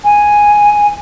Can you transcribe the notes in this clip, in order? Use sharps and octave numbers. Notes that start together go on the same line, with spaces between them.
G#5